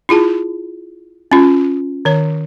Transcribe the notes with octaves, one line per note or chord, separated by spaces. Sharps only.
E4 F4 G#4 A5
C#4 F4
D#3 C#5